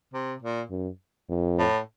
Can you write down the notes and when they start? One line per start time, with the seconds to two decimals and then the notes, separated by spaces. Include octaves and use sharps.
0.14 C3
0.42 A#2
0.71 F#2
1.30 F2
1.58 A2